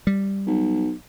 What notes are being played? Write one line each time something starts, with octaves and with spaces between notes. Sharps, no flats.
G3
B1